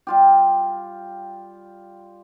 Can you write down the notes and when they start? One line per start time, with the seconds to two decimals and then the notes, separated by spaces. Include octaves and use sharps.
0.07 G3 F4 G4